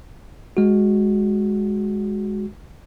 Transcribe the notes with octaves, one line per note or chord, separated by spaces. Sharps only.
G#3 F#4